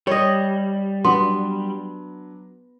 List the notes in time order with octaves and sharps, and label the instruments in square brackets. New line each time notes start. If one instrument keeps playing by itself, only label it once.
[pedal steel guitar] G3 [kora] C#5 D#5
[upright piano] F#3 D4 [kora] B3 [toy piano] C6